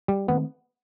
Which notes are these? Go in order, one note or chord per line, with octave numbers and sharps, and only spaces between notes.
G3
D#3 A3 B3 C4